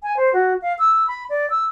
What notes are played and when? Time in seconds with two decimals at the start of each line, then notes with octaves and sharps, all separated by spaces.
0.03 G#5
0.17 C5
0.33 F#4
0.62 F5
0.79 E6
1.08 B5
1.30 D5
1.50 E6